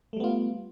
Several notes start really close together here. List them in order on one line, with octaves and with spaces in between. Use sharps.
A3 G3 B3 F4